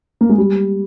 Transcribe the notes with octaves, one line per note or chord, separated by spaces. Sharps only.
A#3
G#3
G3